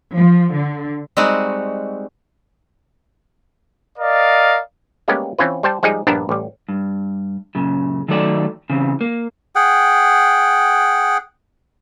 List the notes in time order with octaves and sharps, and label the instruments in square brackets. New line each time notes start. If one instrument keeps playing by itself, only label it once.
[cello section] F3
D3
[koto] G3 G#3 C4 D#4 F#4
[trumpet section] A#4 D5 D#5 F5
[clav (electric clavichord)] G3 G#3 A#3 B3 C#4 G4
E3 C4 C#4 F4 B4
G3 C5 G5 A5
F3 G3 G#3 D#4 G#4
A#1 G2 B3 D4 A#4 A5
A1 G3
[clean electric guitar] G2
F#2 A#2 C#3
D#3 F#3 A3 A4 D5
C#3 E3 C4
A#3
[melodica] G#4 F#5 G5